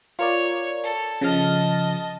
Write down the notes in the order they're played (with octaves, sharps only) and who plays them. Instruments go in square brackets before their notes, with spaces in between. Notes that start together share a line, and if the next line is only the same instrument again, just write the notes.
[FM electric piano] F4 A#4 D5 [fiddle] C#5
[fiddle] A4
[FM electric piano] C#3 F3 F6 [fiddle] D#5 A5